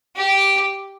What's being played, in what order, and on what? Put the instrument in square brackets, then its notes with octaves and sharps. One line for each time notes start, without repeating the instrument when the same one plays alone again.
[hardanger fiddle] G4